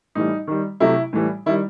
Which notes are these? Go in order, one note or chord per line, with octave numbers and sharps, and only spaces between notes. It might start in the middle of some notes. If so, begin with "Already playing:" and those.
A2 E3 G3 D#4
D#3 G3
C3 F#3 A3 E4
A2 E3 G3
D#3 G3 E4